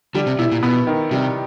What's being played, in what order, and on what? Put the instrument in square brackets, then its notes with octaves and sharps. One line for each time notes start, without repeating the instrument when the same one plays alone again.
[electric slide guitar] D3 [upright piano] G3
[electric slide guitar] C3
[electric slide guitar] B2 [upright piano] E4
[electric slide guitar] A#2
[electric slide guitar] B2 [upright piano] B3
[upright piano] D#3
[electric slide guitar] C3 [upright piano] G3